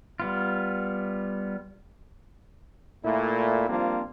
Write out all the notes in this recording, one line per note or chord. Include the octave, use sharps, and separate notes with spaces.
G3 B3 F4
A#2 A3 E4
F3 G3 A#3 C4 D4 F4